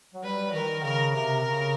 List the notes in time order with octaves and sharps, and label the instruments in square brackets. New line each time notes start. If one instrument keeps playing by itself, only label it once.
[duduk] F#3
[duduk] G3 [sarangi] B4
[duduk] D#3 [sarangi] A#4
[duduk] C#3 [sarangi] A#4
[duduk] C3 [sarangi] A#4
[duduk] C#3